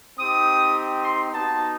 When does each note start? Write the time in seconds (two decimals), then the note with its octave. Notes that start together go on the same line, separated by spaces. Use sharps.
0.18 C4 D#4 G4 D#6
1.03 C6
1.31 B3 D#4 F#4 A5